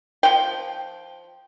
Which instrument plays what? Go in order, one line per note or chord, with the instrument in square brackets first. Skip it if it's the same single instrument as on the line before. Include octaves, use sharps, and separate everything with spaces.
[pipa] F3 G5